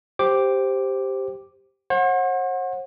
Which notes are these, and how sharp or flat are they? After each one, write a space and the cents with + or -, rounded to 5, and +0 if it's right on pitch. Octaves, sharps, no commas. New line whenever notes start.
G4 +0 C5 +0 D6 +0
C5 +45 F#5 -20